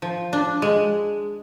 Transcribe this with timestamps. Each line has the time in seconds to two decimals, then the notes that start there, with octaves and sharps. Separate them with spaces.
0.02 F3
0.33 D4
0.62 G#3